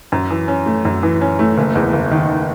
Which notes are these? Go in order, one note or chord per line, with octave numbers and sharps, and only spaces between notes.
F#2
E3
C#4
A3
F#2
E3
C#4
A3
F#1
E2
F#1
D#3